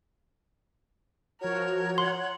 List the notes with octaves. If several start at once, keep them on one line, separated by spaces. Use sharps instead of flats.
F3 F#4 A#4 C#5
F#5 C6